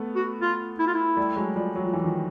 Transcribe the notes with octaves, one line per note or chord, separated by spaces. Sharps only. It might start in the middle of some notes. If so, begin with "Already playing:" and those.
Already playing: A3 B3
F#4
F4
E4
F4
E4
G3 A3
F#3 G#3
F3 G3
F#3
F3
E3
D#3 F3